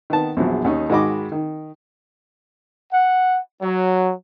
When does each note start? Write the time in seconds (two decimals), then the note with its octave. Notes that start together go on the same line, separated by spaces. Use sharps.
0.10 D#3 B3 A5
0.37 A#1 E2 F3 F#3
0.64 D#2 C#4 D#4
0.90 G#2 D#3 F#4 D#5 B5 D6
1.32 D#3
2.91 F#5
3.61 F#3